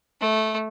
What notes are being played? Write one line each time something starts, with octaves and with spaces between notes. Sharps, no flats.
A3